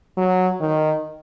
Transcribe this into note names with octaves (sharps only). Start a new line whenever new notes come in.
F#3
D#3